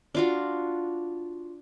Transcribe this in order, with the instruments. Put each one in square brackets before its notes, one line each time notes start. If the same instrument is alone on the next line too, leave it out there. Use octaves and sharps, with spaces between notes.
[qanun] D4 F4 F#4